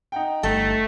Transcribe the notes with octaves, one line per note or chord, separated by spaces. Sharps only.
D#4 F#5 G5
G1 A3 A4